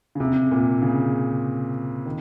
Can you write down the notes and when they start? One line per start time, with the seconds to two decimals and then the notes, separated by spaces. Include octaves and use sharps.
0.15 C#3
0.20 C3
0.52 A#2
0.82 C#3
2.06 D#3